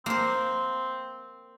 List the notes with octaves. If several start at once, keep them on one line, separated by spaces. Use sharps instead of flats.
A#3 C4 C5